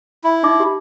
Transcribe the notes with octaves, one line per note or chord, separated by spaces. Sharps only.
E4
D#4 E5 D6
G4